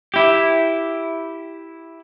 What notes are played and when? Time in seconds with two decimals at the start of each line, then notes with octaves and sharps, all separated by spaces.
0.14 E4 G4